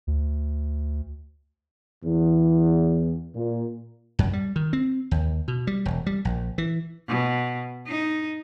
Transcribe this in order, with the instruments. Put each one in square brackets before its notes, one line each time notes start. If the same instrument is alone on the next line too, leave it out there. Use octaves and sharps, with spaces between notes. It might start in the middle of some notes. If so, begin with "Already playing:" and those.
[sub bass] D2
[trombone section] E2
A#2
[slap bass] F#2
G3
D#3
C4
D#2
B2
G3
E1
G3
A#1
E3
[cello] B2
D#4